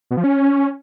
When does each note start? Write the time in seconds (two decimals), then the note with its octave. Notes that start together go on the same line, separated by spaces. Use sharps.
0.11 B2
0.17 F3
0.24 C#4